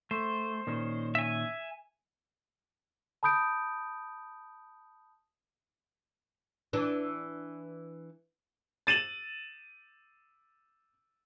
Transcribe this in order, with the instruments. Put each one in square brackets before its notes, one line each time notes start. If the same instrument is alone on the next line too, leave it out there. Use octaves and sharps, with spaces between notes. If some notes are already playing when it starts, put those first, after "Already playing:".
[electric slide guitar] A3 [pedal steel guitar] C5
[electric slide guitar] A#2 D#3 C#4
[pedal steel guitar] E5 G#5
[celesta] A5 B5 D#6 G6 D7
[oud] E3 D4
[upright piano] A6 D#7 E7 F#7